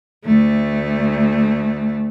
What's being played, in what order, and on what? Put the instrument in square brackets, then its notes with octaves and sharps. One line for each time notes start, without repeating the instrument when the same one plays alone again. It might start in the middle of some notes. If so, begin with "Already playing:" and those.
[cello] D2 A3